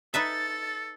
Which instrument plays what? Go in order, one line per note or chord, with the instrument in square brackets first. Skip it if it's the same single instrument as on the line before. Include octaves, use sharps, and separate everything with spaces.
[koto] D#4 B4 E5 [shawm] A4 [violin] A6